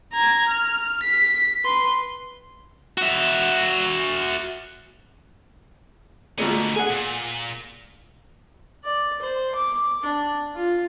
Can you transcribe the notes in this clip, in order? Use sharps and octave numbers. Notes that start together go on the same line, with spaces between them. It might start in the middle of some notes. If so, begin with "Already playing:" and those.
A#5 G#6
F6
B6
B4 C6
F#4 E5
D2 A#2 D3 G#3 B3
G#4 F#5 G#5
A#2
D5
C5
D6
D4
F4